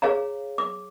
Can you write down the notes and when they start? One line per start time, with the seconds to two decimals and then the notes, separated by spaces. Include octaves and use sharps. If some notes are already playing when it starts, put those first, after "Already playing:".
0.02 G#4 C#5 F5 A#5
0.58 D6